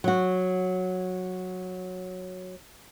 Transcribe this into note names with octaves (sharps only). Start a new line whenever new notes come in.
F#3 F#4